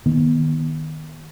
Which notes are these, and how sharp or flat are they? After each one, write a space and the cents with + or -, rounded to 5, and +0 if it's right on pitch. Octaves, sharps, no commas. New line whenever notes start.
D#3 +0 B3 -25